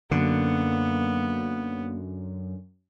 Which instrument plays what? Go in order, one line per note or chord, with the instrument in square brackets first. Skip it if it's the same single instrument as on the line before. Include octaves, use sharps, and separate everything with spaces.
[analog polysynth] F#2 [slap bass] D3 [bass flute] A#3 [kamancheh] B3